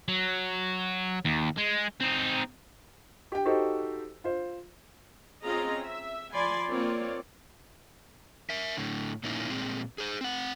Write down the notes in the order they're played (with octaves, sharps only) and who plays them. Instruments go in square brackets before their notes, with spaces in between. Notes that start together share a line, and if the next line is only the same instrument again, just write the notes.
[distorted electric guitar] F#3
D#2
G#3
C4 D#4
[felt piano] G4 G5
D#4 F#4 G4 A4 C5
F4 C5
[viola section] C4 C#4 F4 G#4 D#5 A#5
E5
F3 D5 G#5 B5 C6
A#3 C4 F4 C#5 D5
[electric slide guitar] A#4 E5
A2 D3
A#2 A#3 C#4 D#4 E4
A#2 G#3 C4
G#4 C5
C4 F#5